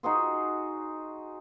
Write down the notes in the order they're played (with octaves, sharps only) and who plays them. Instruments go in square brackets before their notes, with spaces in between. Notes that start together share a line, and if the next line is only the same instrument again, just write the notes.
[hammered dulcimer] D#4 F#4 G#4 C5